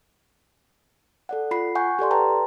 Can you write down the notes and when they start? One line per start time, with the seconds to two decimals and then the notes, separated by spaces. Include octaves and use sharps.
1.29 A4 D5 F#5
1.51 F4 B5 C7
1.75 F#5 G#5 C#6 G6
1.99 G4 A4 D5 C6
2.11 B4 G5 A5 A#5